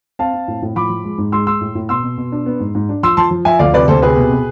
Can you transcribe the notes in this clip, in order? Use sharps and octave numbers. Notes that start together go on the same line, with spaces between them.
C4 F5 A5
C4
A2
A2
F3 B5 D6
F3
G#3
G#2
G#3 C6 E6
G#3 C6 E6
A2
A2
B2 C6 E6
B2
B2
D4
B3
G#2
G#2
D4
F3 C6 E6
F3 A5 C6
F3
F3 E5 G#5
D2 D5 F5
C3 B4 D5
D2 A4 C5
C3 G#4 B4
B2
B2